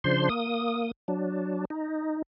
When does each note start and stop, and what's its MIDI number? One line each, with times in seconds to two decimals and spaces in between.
0.04 0.29 49
0.04 0.29 53
0.04 0.29 62
0.04 0.29 72
0.04 0.29 84
0.29 0.91 58
0.29 0.91 87
1.08 1.65 54
1.08 1.65 62
1.70 2.22 63